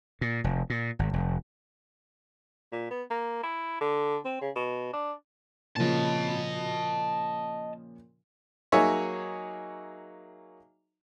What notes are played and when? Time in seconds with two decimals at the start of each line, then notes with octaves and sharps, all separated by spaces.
0.21 A#2
0.44 F1
0.70 A#2
0.99 G#1
1.13 F1
2.72 A#2
2.91 B3
3.10 A#3
3.43 E4
3.81 D3
4.25 C4
4.41 C#3
4.56 B2
4.93 D4
5.77 A#2 C#3 F3 D#5 A5
8.72 F#3 A#3 D#4 G#4 C#5 E5